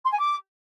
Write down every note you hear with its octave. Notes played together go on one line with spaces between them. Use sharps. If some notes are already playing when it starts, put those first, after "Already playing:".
C6
G#5
D6